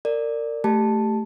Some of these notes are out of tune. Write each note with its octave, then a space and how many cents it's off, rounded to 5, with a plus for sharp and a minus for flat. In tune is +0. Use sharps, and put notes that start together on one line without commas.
A#4 -25 D5 +0
A3 +0 G4 +0 A5 +0